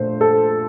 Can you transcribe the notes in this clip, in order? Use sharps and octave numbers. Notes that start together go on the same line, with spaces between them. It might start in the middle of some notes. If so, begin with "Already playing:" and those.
Already playing: A#2 A3 D4 C5
A4